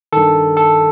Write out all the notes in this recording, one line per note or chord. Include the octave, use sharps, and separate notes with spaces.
G2 D#3 A4
A4